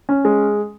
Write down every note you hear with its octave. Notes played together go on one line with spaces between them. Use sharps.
C#4
G#3